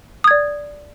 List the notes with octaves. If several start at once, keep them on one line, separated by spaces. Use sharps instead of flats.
D5 D#6 G#6